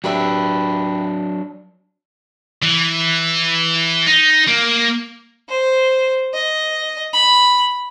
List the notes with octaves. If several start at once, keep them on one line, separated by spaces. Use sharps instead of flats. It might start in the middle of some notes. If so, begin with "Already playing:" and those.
F#3 D4 G4 B4 E5
E3
D#4
A#3
C5
D#5
B5